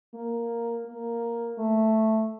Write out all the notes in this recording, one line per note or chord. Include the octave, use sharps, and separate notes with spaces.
A#3
A#3
A3